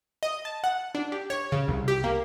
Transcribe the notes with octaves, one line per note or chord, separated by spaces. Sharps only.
D#5
A5
F#5
D4
G4
C#5
C#3
C2
G4
A#3